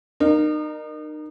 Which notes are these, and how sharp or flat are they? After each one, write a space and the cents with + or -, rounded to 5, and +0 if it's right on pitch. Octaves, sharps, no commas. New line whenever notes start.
D#4 -35 A#4 +5